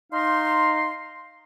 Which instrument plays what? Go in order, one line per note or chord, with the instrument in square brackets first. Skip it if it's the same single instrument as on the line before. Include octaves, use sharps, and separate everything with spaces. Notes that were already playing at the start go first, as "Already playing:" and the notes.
[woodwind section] D#4 F5 C6